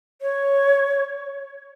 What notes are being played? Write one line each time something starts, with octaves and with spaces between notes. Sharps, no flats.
C#5